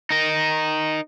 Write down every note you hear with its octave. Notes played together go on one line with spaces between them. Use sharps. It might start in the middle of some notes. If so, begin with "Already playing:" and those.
D#4 A#4